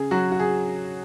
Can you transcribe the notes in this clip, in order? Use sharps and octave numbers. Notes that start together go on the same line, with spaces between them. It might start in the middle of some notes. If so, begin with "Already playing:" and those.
Already playing: C#3 G#4
F#3 F#4
F#4
G#4